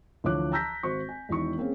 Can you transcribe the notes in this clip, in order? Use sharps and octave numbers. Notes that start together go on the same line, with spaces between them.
D2 E3 F3 C#5 D6 F#6
A5 A#5 E6 G6 A#6 B6
G#1 F#4 C5 C#6
G#5
E1 D#3 E4 C#6
A#3 C4 C#4 G#4